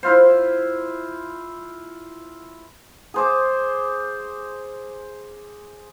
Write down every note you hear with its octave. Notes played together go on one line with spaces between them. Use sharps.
E4 F4 C5
G#4 C5 D6